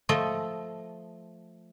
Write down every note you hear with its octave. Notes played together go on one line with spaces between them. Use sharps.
F3 A3 D#5